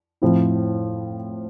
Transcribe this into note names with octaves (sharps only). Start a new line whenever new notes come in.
A2 F3 C4 E4